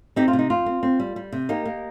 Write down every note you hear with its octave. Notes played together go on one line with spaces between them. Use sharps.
C4 D#4 G4
F4
C3
D#4
F2 F4
C4
C4
G3
G3
C3
A#3 D#4 G4
A#3